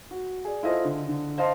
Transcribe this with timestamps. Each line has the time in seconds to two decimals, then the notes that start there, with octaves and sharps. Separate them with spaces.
0.11 F#4
0.45 G#4 D5
0.63 E4 F4 A4 C5 D#5
0.84 D3
1.08 D3
1.38 C5 D#5 F5 A5 C6